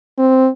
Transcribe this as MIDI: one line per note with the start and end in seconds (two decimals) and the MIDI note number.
0.18 0.49 60